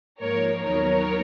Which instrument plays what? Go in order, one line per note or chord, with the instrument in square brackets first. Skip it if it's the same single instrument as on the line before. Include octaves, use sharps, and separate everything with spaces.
[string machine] G#2 F3 A#3 [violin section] A#4 C#5
[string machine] D#2 D#3 F#3 B3 D#4 [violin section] A#4 C#5